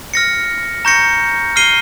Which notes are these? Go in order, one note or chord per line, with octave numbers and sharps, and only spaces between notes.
F6 A#6 C#7
A#5 C#6 G6 A#6 C#7
F6 C7 D#7 G7